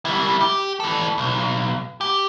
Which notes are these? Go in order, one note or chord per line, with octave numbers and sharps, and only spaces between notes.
G3 E4
G4
E3 A4
B1
G4